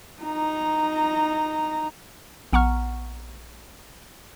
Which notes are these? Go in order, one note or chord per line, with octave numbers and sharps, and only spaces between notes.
D#4 A#5
A#1 B3 F#5 A#5 C#6 F6